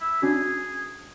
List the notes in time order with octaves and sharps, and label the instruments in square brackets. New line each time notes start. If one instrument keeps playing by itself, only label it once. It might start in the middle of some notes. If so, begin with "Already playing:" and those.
[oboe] E4
[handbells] C#4 D4 F#4 [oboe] G#4